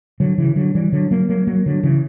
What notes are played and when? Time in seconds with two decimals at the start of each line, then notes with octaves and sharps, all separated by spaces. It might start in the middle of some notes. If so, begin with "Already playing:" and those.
0.20 D3 F#3
0.38 C#3 E3
0.56 D3 F#3
0.75 E3 G3
0.92 D3 F#3
1.11 F#3 A#3
1.29 F#3 A#3
1.47 F#3 A#3
1.66 D3 F#3
1.83 C#3 E3